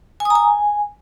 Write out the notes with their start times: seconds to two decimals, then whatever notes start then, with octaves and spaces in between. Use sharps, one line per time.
0.20 G#5
0.25 D#6
0.30 A#5
0.35 G#5